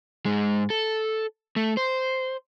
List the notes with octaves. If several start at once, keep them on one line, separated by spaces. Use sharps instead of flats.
G#2 G#3
A4
A3
C5